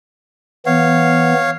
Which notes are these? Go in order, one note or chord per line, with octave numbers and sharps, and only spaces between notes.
E3 B3 C#5 F5